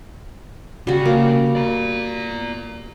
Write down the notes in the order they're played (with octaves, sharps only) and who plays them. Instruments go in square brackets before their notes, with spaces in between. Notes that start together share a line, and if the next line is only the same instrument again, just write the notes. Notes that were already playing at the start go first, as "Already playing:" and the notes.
[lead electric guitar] C#3 [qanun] G3 F#4
[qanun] A#3 D6
[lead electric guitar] D5 A#5